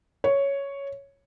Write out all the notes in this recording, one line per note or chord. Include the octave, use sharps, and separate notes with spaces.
C#5